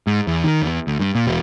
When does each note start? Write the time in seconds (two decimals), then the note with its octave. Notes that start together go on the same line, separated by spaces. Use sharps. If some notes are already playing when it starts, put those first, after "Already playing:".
0.07 G#2
0.27 E2
0.44 D#3
0.62 E2
0.87 D2
0.99 G2
1.15 A#2
1.27 E1